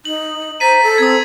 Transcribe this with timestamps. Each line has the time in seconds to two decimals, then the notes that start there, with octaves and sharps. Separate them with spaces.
0.05 D#4 F#7
0.60 C5 A#5 A6 B6 D#7
0.83 A4
0.98 C4 D#6 G#6